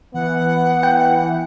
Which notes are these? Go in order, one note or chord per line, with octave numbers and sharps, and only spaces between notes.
E3 B3 F#5
G5